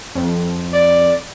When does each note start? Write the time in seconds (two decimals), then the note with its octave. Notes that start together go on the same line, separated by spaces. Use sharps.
0.15 F2
0.73 D5